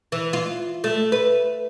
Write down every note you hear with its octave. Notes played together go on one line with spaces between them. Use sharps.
E3
F4
A3
B4